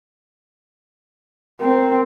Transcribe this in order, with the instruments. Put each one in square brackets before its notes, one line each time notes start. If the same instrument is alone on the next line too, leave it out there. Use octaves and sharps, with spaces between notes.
[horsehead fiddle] C4 [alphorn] A#4